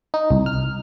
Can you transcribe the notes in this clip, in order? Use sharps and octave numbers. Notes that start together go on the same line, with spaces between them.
D#4
C2
F6